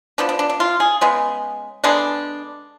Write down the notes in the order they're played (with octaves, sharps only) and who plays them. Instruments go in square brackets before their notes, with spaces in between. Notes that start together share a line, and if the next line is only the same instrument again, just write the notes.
[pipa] F3 B3 D4
D4
D4
D4
F4
G#4
C#3 G#3 B3
D3 G#3 B3 D4